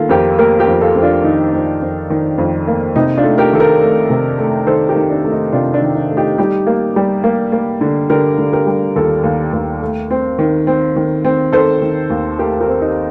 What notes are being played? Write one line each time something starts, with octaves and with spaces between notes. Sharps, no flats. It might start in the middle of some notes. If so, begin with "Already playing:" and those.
Already playing: D#3 A#3 F4 A4
F2 G4 A#4
A#3 G4 A#4
G4 A#4
F2
F4 A4
F2
D4 F4
D#3 D#4
F2
F2
D#3
F2
A#3
C3 D#4
D4 F4
A3
G4 A#4
D#3 A4
G4 A#4
A3
C3
A3
D#3 A4 C5
G4 A#4
D#3
D4
A3
D#4
C3 D4 F4
D4
D#3
D#4
A3
D#4 G4
G3 D#4 G4
A#3
G3
A#3
A#3
D3
D3 G4 A#4
D3
G4 A#4
G3
D#2 F4 A4
D#2
D#2
A3
C4
D#3
C4
D#3
C4
D#3 A4 C5
D#3
D#2
A3 G4 A#4
G4 A#4
C4
D#4